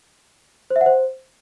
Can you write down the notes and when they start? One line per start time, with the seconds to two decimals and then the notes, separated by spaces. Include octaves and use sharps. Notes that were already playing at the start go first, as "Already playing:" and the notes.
0.70 C5
0.76 E5
0.81 F#5
0.86 C5